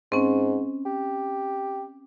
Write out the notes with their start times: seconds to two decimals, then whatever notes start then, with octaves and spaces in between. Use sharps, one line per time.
0.12 G#2 C4 C#4
0.86 G4